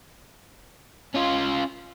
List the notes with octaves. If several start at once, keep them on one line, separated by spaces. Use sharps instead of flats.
C#4 F4